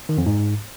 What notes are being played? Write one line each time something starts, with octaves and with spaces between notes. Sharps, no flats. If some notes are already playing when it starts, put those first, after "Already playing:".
D#3
F2
G#2